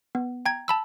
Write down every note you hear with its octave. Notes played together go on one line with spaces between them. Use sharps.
B3
G5 A#5 G#6
A5 B5 E6